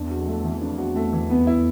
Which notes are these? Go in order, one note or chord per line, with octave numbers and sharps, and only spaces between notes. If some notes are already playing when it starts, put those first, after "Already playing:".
Already playing: E2 D4
F#4
F2
A3
E2
E3
F2 D4
F#4
A3
E3
B3
E4